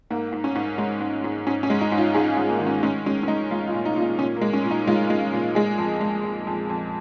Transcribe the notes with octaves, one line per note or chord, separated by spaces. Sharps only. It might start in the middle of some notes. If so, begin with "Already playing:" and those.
G#2 A#3
G#2
C#4
G#2
G#3
G#2
G#2
G#2 C#4
C#4
G#3
D#4
G#2
F4
G#2 G#4
G#2
A#3
D#3 D#4
C#4
G#3 C#4
G#3 C#4
C#4
G#3 D#4
G#3 F4
F4
A#2
D#4
A#2
D#4
A#2 C#4
A#3
G#3
C#4
A#2
D#4
G#3 F4
G#3
A#2
G#3 G#4
F2
G#3
F2
F2
F2